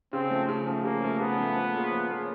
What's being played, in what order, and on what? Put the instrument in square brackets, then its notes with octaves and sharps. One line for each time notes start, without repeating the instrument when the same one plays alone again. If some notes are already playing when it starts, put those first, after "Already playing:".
[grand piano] C#3 [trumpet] C4
[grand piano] F3 A3
C#3
F3 A3
[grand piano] C#3 [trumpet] A#3
[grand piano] F3 A3
[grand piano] C#3 [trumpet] B3
[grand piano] F3 A3
F3
A#3 C#4 F4 G#4
F3
A#3 C#4 F4 G#4